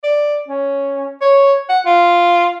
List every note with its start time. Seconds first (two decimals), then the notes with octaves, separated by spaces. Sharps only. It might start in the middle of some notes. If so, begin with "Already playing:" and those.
0.03 D5
0.48 C#4
1.21 C#5
1.69 F#5
1.86 F4